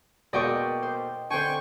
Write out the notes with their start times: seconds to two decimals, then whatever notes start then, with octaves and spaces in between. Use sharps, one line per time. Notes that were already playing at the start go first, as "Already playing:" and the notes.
0.33 B2 G#3 A#3 D5 D#5 G5 C#6
0.83 C5
1.30 D3 D4 C5 G5 G#5 C#6